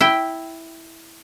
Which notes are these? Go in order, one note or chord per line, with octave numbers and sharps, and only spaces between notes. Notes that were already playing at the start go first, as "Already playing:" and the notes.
E4 G5